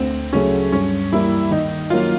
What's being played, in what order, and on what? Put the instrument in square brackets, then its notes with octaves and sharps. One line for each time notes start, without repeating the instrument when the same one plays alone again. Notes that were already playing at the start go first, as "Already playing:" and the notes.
Already playing: [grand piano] D2 [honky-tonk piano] C4
[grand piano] C#3 F#3 A3 [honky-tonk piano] C#4
[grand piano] G2 [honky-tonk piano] C#4
[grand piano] E3 G3 A#3 [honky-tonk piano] E4
[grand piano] D#3 [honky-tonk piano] D#4
[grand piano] F#3 A#3 C#4 [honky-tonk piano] F4